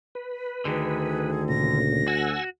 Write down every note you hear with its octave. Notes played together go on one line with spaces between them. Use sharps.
B4
D2 D3 D#3 G#4
A#2 C#3 A#6
F#4 F#5 G#5 E6